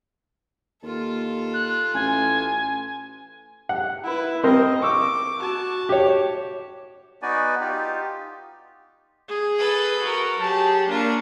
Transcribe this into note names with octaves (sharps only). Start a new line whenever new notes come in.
D#2 F4 A4
F#6
A1 G#5
F#5
E4 B4
C4 A#4 D#5
C#6 D6 E6
F#4 A5
G4 C#5
B3 D#4 F#4 B4 D5 G#5
D#4 F4 G4
G#4
A4 B4
F#4 A#4
F#3 G4 G#4 A5
A#3 D4 F4 A#4 C#6